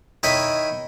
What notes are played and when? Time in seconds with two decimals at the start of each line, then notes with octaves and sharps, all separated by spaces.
0.23 D#3 E4 C#5 D#5 B5